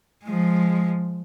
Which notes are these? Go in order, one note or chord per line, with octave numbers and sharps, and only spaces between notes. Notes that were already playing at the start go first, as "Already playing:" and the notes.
F3 G#3